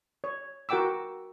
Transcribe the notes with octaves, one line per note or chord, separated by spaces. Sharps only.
C#5
F#4 A#4 F#5 G5 D6 E6